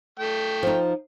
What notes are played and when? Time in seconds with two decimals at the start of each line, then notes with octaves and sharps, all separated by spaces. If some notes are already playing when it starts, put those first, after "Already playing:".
0.19 A3 G5
0.63 F3 D#4